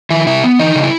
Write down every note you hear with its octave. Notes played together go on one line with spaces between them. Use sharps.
D#3 E4 E5
C3 E4 E5
B3
E3 D#4 D#5
C#3
E4